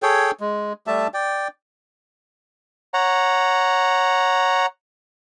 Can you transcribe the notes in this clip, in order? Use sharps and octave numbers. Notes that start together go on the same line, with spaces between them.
G#4 A4 C#5 G5
G#3
G3 A3 E5 A5
D5 G5
C#5 F#5 A#5